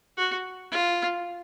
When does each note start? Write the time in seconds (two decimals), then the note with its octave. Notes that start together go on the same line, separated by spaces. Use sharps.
0.17 F#4
0.72 F4